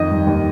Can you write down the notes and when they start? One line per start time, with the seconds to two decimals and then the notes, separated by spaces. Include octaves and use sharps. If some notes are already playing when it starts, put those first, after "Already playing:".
Already playing: F2 D#3 D#5
0.10 G2
0.27 D#2